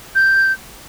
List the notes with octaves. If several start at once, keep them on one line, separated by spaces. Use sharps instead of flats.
G6